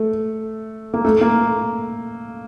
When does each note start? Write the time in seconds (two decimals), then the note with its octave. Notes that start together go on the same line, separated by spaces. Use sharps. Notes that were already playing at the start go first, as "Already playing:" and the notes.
Already playing: A3
0.94 A#3
1.05 A3
1.21 A#3